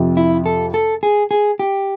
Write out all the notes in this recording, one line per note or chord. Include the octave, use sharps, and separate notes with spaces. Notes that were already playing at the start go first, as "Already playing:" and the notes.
Already playing: F2 C3 F3
E4
A4
A4
G#4
G#4
G4